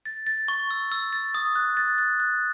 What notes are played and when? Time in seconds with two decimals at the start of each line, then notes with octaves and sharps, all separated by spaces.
0.06 A6
0.27 A6
0.48 C#6
0.71 E6
0.92 E6
1.13 A6
1.35 D#6
1.56 F#6
1.77 A6
1.98 F#6
2.20 F#6